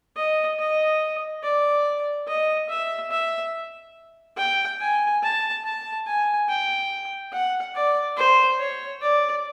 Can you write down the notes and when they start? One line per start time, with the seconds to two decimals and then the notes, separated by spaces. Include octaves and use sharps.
0.16 D#5
0.60 D#5
1.43 D5
2.28 D#5
2.70 E5
3.11 E5
4.37 G5
4.81 G#5
5.23 A5
5.65 A5
6.07 G#5
6.49 G5
7.33 F#5
7.75 D5
8.17 C5
8.59 C#5
9.01 D5